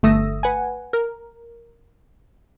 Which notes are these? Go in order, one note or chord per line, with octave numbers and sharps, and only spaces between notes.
G1 A3 D#6 E6 A#6
B4 F#5 G#5
A#4